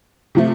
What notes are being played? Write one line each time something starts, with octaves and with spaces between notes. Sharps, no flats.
C3 F3 A3